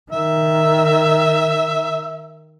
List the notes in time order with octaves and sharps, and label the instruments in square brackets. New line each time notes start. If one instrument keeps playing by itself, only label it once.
[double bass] D#3 [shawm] E5